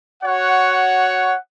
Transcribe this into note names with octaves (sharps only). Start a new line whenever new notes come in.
F#4 C#5 F#5